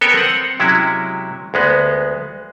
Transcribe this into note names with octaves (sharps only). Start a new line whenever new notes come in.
B3 A4 A#4 C#5 G5 G#5
C4 F#5
C3 F#3 G#3 C#4 E4
D2 G#3 B3